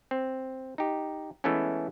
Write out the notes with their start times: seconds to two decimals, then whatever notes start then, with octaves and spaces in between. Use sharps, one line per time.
0.11 C4
0.78 D#4 G4
1.44 E3 G#3 A3 B3 C#4